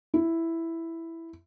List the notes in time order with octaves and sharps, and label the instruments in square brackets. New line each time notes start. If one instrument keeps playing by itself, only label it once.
[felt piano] E4